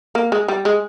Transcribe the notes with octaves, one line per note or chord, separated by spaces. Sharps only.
A#3
G#3
G3
G#3